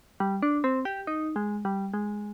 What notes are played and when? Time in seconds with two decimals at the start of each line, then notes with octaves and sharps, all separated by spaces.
0.20 G3
0.43 D4
0.64 C4
0.85 G4
1.07 D#4
1.36 G#3
1.65 G3
1.94 G#3